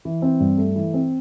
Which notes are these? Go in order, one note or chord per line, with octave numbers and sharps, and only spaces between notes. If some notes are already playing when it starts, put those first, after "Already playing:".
E3
C4
G2
A3
E3
C4